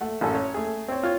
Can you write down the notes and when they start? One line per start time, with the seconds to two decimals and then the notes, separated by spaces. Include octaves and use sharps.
0.01 A3 F#5
0.21 A1 F#2 C#4 A4
0.34 C#5
0.54 A3 G#4
0.88 C4 C#5
1.03 F4 C#5